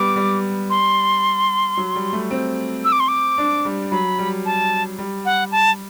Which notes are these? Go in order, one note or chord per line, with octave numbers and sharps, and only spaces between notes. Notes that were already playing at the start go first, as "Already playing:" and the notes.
Already playing: G3 B3 D6
G3
C6
F#3
G3
A3
C4
E6
D6
C6
D6
D4
G3
F#3 B5
G3
A5
G3
F#5
A5